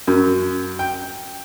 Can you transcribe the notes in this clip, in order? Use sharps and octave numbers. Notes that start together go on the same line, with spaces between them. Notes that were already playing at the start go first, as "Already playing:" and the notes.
F#2
G5